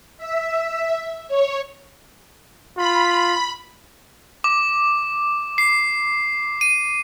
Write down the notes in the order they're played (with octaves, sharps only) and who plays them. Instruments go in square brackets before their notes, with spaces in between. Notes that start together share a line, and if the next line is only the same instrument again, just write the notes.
[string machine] E5
C#5
[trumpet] F4 [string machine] B5
[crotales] D6
C7
D#7